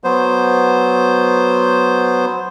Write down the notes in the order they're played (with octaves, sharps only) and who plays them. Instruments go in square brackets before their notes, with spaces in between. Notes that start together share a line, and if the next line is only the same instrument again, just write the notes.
[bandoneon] F#3 B3 C5